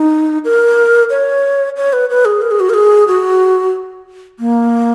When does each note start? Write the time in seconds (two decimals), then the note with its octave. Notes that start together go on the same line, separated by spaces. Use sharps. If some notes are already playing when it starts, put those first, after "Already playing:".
Already playing: D#4
0.45 A#4
1.10 C#5
1.77 C#5
1.93 B4
2.10 B4
2.25 G#4
2.42 A#4
2.51 G#4
2.60 F#4
2.70 A#4
2.74 G#4
3.08 F#4
4.39 A#3